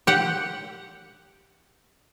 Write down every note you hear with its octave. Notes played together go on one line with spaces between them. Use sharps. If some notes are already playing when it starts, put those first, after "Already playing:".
G4 F#5